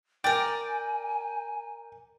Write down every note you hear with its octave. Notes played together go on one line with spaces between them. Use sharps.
A#4 D5 G5 G#5